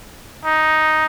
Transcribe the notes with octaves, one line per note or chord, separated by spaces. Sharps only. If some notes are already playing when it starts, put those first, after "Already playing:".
D#4